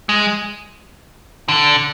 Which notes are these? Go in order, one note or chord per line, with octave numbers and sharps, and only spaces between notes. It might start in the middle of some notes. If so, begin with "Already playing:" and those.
G#3
D3